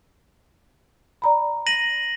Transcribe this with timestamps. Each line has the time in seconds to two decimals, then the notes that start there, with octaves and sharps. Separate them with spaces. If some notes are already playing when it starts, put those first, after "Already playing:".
1.22 D5 A#5 B5
1.67 A#6 D#7 F#7